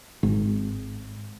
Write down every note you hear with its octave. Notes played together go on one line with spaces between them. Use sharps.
G#1